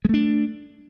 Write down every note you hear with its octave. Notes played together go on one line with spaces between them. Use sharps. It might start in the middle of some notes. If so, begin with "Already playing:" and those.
G#3 A3 D4